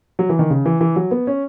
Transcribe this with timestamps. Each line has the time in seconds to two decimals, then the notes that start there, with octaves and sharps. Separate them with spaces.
0.19 F#3
0.29 E3
0.39 D#3
0.50 C#3
0.65 E3
0.81 E3
0.96 F#3
1.11 B3
1.27 C#4